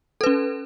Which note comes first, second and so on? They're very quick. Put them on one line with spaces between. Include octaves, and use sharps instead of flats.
A4 B4 C#4